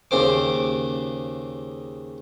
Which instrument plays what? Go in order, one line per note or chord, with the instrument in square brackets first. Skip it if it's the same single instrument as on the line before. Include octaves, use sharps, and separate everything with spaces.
[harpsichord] D#2 C#3 G4 C5 D6